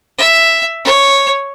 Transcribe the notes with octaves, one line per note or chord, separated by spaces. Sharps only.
E5
C#5